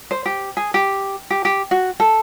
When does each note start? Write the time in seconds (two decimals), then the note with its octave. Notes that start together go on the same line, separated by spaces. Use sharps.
0.11 C5
0.26 G4
0.57 G#4
0.74 G4
1.30 G4
1.45 G4
1.71 F#4
2.00 A4